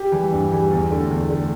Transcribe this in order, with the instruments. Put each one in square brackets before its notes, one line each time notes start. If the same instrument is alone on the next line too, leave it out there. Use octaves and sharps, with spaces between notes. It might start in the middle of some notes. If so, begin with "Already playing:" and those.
Already playing: [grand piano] G4
E3 G3
G2
E3 G3
E2
D3 A3
E2
D3 A3